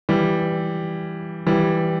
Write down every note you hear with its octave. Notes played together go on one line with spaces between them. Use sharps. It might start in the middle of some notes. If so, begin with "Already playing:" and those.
E3 G3
E3 G3